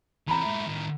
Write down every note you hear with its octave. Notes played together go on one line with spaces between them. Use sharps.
E3 C4 A#5 B5
G#2 E4
A2 D#3